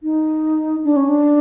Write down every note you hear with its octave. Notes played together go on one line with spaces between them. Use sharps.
D#4
D4
C#4
D4